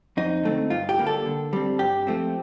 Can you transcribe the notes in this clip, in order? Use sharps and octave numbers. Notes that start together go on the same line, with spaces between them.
F2 D#4
D3 A3 C4
G2 F4
G4
D3 G3 A#3
A4
D3
G3 C4
G2 G4
F3 A3 C4